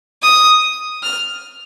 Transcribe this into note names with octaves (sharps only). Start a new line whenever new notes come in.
D#6
F6